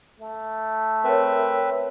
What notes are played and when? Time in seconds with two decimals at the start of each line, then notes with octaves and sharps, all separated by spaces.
0.20 A3
1.04 C4 A#4 B4 C#5 E5